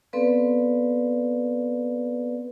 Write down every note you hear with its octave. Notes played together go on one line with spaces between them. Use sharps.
B3 C4 A4 B4 D5 F5